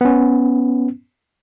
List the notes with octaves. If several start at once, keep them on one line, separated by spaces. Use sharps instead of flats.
B3 C#4